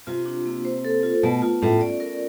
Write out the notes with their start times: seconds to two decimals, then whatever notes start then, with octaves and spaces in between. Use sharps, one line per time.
0.07 C3 F4
0.26 D4
0.46 A#3
0.65 C5
0.85 A4
1.03 F4
1.23 B2 A3
1.42 F4
1.62 A2 C#4
1.81 D5
2.00 A#4